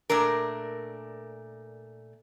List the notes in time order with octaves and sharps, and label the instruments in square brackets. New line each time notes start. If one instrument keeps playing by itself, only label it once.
[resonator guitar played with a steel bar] A#2 A3 D4 A#4